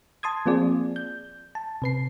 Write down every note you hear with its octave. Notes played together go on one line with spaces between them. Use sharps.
A5 C6 D#6 G#6
F3 A#3 C4 F4 G#4 D5
G6
A5
C3 B4 C7